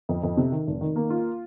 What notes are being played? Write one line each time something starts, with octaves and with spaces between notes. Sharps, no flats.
F2
F2
C3
D#3
F1
D#3
A#3
F4